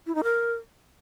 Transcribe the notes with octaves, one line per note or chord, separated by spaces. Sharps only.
E4
D#4
A#4